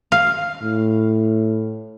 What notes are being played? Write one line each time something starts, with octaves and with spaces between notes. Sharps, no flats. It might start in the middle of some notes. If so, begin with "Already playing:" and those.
F5
A2